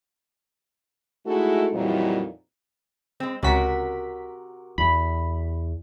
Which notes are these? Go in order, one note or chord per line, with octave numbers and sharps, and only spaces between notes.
G#3 A3 D#4 E4 F#4 A4
F2 A#2 E3 F#3 G3 D#4
G#3 C4
C#2 C3 C#4 F#4 A#4 B6
E2 B5